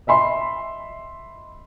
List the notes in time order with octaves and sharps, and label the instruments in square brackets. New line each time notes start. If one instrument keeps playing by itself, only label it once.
[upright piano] D#5 E5 B5 C6